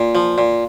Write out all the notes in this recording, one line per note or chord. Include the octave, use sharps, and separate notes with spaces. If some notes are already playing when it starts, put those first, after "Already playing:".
Already playing: A#2
F3
A#2